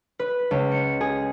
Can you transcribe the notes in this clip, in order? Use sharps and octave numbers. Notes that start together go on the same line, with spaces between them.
B4
C#2
C#7
G#4